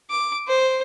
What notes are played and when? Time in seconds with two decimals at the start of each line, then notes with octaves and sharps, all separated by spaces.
0.10 D6
0.48 C5